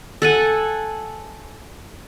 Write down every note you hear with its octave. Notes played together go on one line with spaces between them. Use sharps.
A4 F#5 G#5